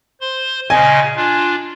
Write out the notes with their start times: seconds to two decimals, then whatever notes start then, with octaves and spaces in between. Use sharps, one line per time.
0.21 C5 C6
0.70 A#2 C#3 D#5 G#5
1.17 D4 F4